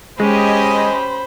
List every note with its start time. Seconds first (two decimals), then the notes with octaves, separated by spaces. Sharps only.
0.20 G#3 C#4 G4 C5 D#5 G#5 B5